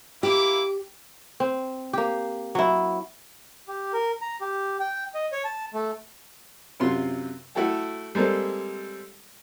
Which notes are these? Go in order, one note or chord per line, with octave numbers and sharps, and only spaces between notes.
A#3 E4 G4 D6
C4
A#3 G4
F#3 E4
G4
A#4
A#5
G4
G5
D#5
C#5
A5
A3
F#2 C3 F4 C6
A3 E4 F#4 A4 G5 A5
G3 G#3 A#3 C4 A4